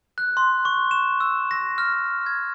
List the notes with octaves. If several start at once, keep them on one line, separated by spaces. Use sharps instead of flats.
F#6
C6
C#6
E7
E6
A#6
F6
G#6